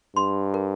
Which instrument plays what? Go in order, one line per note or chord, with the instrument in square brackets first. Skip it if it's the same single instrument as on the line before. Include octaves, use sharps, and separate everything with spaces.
[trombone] G2 [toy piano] C6
[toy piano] A#4